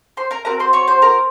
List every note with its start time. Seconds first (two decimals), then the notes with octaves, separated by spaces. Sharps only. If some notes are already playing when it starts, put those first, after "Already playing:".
0.17 C5 C6
0.31 A#4 A#5
0.45 C4 F#4 A#4 A#5
0.59 C5 C6
0.73 C#5 C#6
0.88 C5 C6
1.02 A#4 A#5